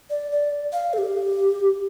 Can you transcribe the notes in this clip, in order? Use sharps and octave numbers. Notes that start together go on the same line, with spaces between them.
D5
D5
F5
A4
G4